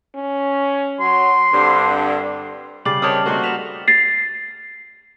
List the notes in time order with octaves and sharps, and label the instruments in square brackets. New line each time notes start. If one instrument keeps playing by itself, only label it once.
[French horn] C#4
[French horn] F#3 [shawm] C6
[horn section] G2 C4 [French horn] D3
[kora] C#3 G3 [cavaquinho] D6 [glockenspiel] A6 C7 F#7
[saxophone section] C3 D#3 C#5 [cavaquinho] A5 D6 D#6 [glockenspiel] F6
[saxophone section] A3 F#4 [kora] A#3 D#4 [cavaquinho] C5 C6
[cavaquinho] B4 [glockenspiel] B6 E7 F7
[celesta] A6 C7